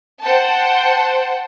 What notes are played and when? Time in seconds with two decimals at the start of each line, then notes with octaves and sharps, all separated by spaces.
0.22 C5 F#5 G5 A5